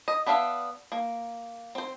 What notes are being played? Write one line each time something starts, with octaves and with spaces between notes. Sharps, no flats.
D#5
B3 D4 E5 F5
A#3
C4 C5